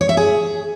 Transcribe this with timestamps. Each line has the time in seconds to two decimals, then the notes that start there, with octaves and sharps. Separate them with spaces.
0.01 C#5
0.09 E5
0.17 G#4